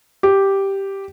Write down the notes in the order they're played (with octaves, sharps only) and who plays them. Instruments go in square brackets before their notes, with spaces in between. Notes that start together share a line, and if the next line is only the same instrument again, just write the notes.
[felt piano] G4